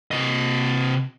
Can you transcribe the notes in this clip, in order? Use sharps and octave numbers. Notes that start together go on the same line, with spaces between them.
C3 D#5